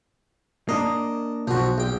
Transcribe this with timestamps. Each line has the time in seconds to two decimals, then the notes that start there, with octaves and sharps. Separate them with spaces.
0.69 A#3 D4 D#5
1.47 B1 F3 F#4
1.78 A#1 G5